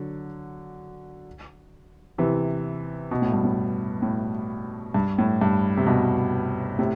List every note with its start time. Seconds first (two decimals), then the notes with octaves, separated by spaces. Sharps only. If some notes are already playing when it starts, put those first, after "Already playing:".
Already playing: D3 F#3
2.18 C3 E3
3.11 B2
3.22 A2
3.32 G2
3.45 A2
4.02 A2
4.94 G2
5.18 A2
5.41 G2
5.77 C3
5.87 G2 B2
6.79 A2 C3